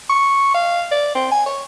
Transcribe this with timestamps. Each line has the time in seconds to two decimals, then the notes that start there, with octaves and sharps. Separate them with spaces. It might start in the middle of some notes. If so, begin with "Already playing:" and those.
0.10 C#6
0.54 F5
0.91 D5
1.15 C4
1.32 G#5
1.46 C#5